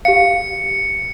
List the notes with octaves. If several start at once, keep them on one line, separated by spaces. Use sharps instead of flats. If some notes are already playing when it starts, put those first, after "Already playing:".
G4 F5 C#7